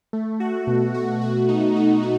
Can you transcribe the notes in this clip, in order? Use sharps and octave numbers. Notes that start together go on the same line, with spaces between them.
A3
F#4
B2
F#4
F#4
D#4
D#4
F#4